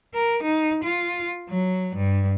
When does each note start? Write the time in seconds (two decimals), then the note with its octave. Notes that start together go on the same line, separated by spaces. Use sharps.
0.14 A#4
0.43 D#4
0.84 F4
1.49 F#3
1.96 G2